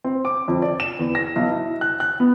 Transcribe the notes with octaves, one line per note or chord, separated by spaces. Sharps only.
C4
D6
F2
D5
E7
E2
A#6
B1
E4
F#6
F#6
B3